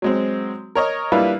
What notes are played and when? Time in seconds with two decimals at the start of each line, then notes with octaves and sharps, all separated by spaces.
0.02 F#3 G#3 C4
0.75 A#4 C#5 D#5
1.12 G3 A#3 D4 E4 F4 B4